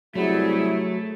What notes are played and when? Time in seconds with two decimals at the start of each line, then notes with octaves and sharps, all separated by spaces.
0.15 C2 F#3 G3 A3 E4 G#4